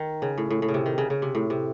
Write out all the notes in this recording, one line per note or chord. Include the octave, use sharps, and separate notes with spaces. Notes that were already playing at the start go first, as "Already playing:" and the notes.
Already playing: D#3
C#3
A2
A2
A2
C#3
C3
D#3
C#3
C#3
C3
A2
C3